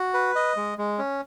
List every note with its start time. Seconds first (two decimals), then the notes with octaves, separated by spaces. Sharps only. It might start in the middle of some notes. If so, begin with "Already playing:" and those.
Already playing: F#4
0.14 B4
0.36 D#5
0.57 G#3
0.78 G#3
0.98 C#4